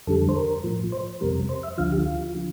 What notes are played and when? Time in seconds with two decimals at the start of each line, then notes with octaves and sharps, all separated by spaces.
0.07 F2 D3 G3 A4
0.29 C5
0.36 A#4
0.64 A2 F3
0.92 C5
1.21 F2 C3 G3 A#4
1.49 C5
1.63 E5
1.78 D2 D3 F3 F5
1.92 G4
2.06 F4
2.35 D3 F3